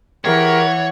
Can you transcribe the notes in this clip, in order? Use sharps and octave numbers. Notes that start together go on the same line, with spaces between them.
E3 G4 G#4 A#4 C#5 F#5